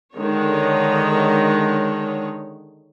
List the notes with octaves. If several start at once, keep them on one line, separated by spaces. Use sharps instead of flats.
D3 D#3 G#3 C#5